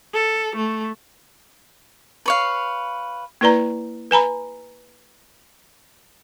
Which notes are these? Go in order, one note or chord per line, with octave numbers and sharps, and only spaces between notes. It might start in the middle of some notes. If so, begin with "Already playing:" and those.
A4
A3
B4 C#5 F5
A#3 E4 B4 D5 A#5
B4 G#5 A#5 B5